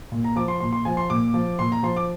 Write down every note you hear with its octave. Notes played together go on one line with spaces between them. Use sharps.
A#2
A#5
F3 D6
C6
A#2 C6
C6
F3 G#5
C6
A#2 D6
F3
A#2 C6
A#5
F3 C6
D6